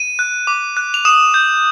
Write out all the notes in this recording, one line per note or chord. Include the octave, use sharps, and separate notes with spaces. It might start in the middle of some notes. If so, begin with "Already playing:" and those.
Already playing: D#7
F#6
D6
F#6
F7
D#6 E7
G6